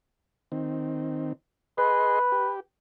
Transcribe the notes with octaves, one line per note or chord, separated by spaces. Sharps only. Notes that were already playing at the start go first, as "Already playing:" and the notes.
D#3 C4
G#4 B4 D#5 C6
G4